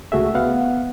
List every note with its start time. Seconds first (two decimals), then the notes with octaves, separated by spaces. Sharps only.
0.12 C#2 A3 F#4 G#4 E5
0.35 B3 F5 F#5